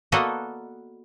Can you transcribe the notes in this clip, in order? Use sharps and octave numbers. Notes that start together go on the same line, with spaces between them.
A#3 B3 F#4 A4 D5 D#5